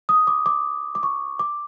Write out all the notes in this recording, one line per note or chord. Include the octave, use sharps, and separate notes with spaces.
D#6
D6
D6
D6
C#6
D6